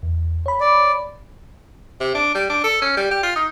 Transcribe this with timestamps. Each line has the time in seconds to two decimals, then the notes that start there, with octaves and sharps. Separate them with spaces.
0.03 E2
0.46 C#5 B5
0.61 D5
2.00 C3
2.15 D4
2.35 G3
2.50 D4
2.64 A4
2.82 C#4
2.97 G3
3.11 G4
3.23 F4
3.36 D#4